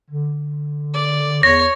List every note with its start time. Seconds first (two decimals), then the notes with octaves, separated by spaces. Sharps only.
0.10 D3
0.94 D5
1.43 E2 C#5 A#6